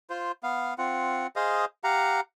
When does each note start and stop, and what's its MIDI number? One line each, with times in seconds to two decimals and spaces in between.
0.10 0.32 65
0.10 0.32 72
0.43 0.74 59
0.43 0.74 77
0.78 1.27 60
0.78 1.27 65
0.78 1.27 78
1.36 1.65 68
1.36 1.65 72
1.36 1.65 75
1.36 1.65 77
1.84 2.21 67
1.84 2.21 77
1.84 2.21 78
1.84 2.21 82